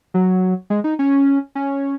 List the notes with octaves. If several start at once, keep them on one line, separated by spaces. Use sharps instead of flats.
F#3
G#3
D#4
C#4
C#4